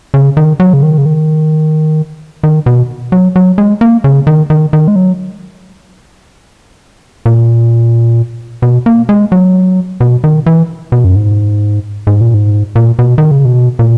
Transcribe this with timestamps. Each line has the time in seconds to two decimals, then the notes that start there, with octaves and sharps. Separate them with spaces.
0.14 C#3
0.37 D#3
0.60 F#3
0.73 C#3
0.83 D#3
0.98 C#3
1.05 D#3
2.43 D#3
2.66 B2
3.12 F#3
3.36 F#3
3.58 G#3
3.81 A#3
4.04 C#3
4.27 D#3
4.50 D#3
4.73 D#3
4.88 G#3
4.96 F#3
7.26 A#2
8.62 B2
8.86 A#3
9.09 G#3
9.32 F#3
10.00 B2
10.24 D#3
10.46 E3
10.92 B2
11.04 F#2
11.15 G#2
12.07 G#2
12.21 A#2
12.34 G#2
12.76 A#2
12.99 B2
13.18 D#3
13.31 C#3
13.45 B2
13.79 A#2